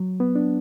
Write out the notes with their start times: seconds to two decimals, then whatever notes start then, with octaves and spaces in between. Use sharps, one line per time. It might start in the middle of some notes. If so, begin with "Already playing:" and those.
Already playing: F#3
0.20 B3
0.35 D4